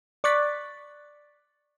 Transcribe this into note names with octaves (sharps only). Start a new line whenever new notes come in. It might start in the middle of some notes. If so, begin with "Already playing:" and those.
D5 C#6 D6 F#6 A6 B6